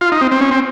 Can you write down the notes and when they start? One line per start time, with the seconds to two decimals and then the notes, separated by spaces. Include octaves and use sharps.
0.01 F4
0.12 D#4
0.21 C4
0.31 C4
0.41 C#4
0.51 C4